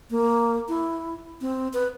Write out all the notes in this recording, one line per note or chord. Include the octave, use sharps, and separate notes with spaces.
A#3
E4
C4
B4